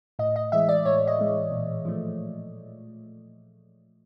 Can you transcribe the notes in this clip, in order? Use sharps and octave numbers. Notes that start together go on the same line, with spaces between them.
A2 D#5
D#5
E3 G#3 E5
D5
A2 C#5
D#5
E3 G#3
A#2
F3 A3